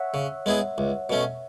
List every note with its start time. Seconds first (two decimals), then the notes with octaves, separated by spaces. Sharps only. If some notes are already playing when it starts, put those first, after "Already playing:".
Already playing: C#5 E5 F#5
0.14 C#3
0.46 G#3 B3 E4 G#4
0.78 C#2
1.10 B2 A3 C#4